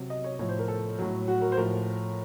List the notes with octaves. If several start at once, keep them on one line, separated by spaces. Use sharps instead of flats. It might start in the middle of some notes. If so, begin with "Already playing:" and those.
Already playing: C3 F#3
D#5
C#5
A2 F3 C#5
C5
A#4
A4
A2 F#3
F#4
A#4
C5
A2 F3 A#4